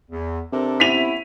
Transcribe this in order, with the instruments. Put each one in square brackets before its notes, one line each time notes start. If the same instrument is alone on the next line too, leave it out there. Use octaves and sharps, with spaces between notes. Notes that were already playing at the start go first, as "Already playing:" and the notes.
[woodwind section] E2
[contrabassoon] C3 [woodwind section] D4 A4 A#4
[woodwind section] B3 C#4 E4 [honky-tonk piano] B6 D#7 F7